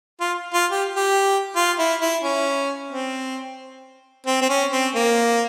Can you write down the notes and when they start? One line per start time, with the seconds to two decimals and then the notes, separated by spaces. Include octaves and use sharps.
0.21 F4
0.54 F4
0.71 G4
0.96 G4
1.56 F4
1.79 E4
2.01 E4
2.23 C#4
2.91 C4
4.27 C4
4.42 C4
4.49 C#4
4.72 C4
4.95 A#3